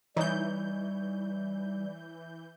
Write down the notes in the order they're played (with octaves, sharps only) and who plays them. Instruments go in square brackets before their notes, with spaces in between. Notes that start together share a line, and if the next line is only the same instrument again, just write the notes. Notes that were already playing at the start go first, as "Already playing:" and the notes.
[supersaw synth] E3 G6 [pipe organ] G3 [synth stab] D#4 [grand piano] C#5